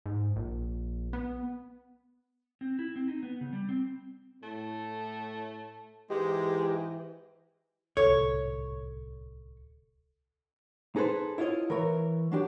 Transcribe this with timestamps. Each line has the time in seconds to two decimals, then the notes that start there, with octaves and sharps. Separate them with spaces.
0.06 G#2
0.36 A#1
1.13 B3
2.61 C4
2.79 E4
2.96 C4
3.08 D#4
3.23 B3
3.41 C#3
3.53 G3
3.69 C4
4.43 A2 A3
6.10 G#2 E3 G#3 G4
7.97 D1 C2 A4 C#5
10.96 D#4 G#4 A4 B4 C5
11.38 E4 F4 C#5 D#5
11.70 E3 A#4 C#5
12.32 F#3 D4 G4